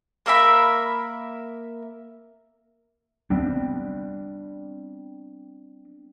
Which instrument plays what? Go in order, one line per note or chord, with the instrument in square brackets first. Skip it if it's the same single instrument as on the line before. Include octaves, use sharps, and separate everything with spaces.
[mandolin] A#3 A#4 E5 B5
[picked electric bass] G3 B3 C4 D4